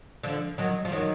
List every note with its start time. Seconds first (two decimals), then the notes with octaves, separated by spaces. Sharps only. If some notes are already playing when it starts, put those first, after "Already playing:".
0.23 D3 F3
0.58 D#3 F#3
0.85 F3
0.92 D#3 F#3